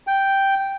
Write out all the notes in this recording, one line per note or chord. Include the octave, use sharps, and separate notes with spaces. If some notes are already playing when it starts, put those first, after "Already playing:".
G5